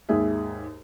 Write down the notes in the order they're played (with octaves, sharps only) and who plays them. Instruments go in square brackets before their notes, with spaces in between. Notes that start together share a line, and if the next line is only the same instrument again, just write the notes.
[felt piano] D#2 G#2 G#4 E5